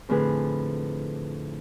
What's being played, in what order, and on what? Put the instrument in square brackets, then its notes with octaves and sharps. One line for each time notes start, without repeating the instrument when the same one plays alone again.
[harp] F2 A2 D3 G#4 B4